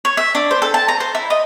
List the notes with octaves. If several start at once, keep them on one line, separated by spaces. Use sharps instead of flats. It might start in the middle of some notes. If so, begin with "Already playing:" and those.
C#5
E5
D4
C5
A4
A5
A#5
C5
E4
D#5